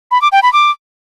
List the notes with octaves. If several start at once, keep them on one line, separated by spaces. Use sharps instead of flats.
B5
D6
G5
B5
D6